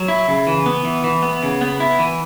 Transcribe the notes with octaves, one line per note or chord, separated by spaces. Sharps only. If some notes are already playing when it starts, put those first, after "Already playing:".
Already playing: F#3
E4
C#3
E3
B3
E3
E3
B3
C#3
B3
E4
E3